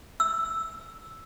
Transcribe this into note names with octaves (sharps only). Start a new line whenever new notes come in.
E6